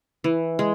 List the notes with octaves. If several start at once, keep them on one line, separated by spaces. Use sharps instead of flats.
E3
G#3